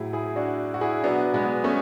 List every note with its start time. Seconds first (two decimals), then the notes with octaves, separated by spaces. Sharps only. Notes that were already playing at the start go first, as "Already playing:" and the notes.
Already playing: A2 F#3 E4 G#4
0.13 E4 G#4
0.36 D4 F#4
0.74 F#4
0.81 E4 G#4
1.04 B2 F#3 B3 D4
1.34 G#3 B3
1.64 A3 C#4